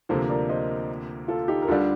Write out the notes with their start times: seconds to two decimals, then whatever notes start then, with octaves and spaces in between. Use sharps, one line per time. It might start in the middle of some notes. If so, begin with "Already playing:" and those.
0.09 D2 C3 F3 A#3 A4 C5
0.29 A#4 D5
0.49 C5 D#5
1.28 F4 A4
1.48 D#4 G4
1.62 A#4
1.68 D2 D3 G3 D4 F4 A4